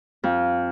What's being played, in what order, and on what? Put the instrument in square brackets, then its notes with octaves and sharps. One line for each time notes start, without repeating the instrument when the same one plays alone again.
[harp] F2